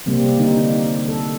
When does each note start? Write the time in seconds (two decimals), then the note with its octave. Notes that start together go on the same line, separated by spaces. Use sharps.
0.06 C3 G3 A#3 C4
0.38 D3 G3 A#3 D#4
1.08 A4